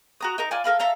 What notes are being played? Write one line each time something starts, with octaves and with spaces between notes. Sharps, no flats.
F#4 A#5 D#6
D#4 A#4 A#5
F4 D5 G#5
A4 A#4 F5 B5
A4 E5 F5 A#5